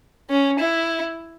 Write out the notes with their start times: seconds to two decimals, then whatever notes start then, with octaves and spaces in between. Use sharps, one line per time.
0.30 C#4
0.60 E4